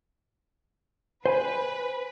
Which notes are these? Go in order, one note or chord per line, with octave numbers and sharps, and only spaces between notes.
B4 C5 G#5 B5